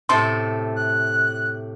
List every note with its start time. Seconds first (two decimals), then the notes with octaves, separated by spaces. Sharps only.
0.09 A2 C3 A4 C6
0.76 F#6